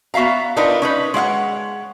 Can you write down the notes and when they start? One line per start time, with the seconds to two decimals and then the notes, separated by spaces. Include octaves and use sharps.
0.14 B3 F#4 E5 F5 A#5
0.57 D4 D#4 F4 A#4 B4
0.82 C#4 D#4 B4
1.14 G#3 C#5 F5 F#5